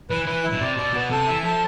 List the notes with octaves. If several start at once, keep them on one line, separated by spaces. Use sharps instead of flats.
E3 B4
E3 B4
E4
B2
C3 D5
B2 D5
B2 B3
C3 A4
E3 E5
F3 A4